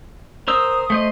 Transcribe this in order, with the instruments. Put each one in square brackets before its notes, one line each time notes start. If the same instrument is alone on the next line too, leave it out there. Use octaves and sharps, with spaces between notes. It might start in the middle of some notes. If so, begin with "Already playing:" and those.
[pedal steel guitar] A#4 C5 E6 [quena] D#6
[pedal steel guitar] A3 C5 D#5